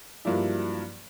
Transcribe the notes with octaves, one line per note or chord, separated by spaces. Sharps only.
G2 F3 F#3 A#3 D4 E4